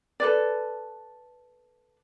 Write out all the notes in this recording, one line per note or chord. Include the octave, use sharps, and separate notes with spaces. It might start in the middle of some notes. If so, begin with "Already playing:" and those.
A4 B4 D5